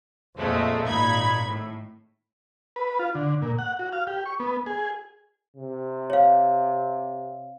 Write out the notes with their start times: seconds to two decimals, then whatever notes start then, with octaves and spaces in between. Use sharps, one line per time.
0.38 F2 A#2 G#3 A3
0.86 G#1 A#2 D#4 B5 G#6
1.45 A2
2.76 B4
2.99 F4
3.15 D3
3.42 A#2
3.59 F#5
3.79 F#4
3.93 F5
4.07 G4
4.26 C#6
4.40 B3
4.66 G#4
5.57 C3
6.10 C#5 F5